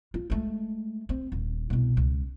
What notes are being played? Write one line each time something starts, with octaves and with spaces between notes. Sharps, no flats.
F4
G#3 A3
C4
D#1
C2 B2
C#2